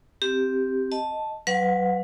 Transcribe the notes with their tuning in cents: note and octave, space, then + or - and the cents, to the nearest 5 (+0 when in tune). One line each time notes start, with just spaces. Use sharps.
C4 +0 G4 +0
D#5 +0 A5 +0
F#3 +25 B4 +15 F#5 -45